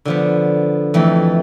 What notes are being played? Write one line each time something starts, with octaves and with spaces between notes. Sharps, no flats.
D3 F3 B3
F2 E3 A3